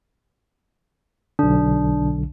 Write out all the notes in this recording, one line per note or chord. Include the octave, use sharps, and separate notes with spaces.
B1 D3 D4